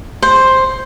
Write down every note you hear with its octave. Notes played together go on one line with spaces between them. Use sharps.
C5